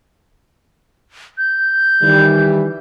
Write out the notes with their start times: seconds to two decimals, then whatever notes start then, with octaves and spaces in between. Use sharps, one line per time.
1.38 G6
2.02 D#3 E3 G3